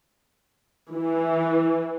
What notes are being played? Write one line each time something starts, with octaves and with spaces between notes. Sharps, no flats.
E3